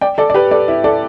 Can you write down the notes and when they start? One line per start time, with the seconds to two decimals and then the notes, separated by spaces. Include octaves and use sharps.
0.01 D5 G5
0.18 A4 D5
0.30 D5
0.34 G4 B4
0.51 A4 D5
0.68 E4
0.84 A4 D5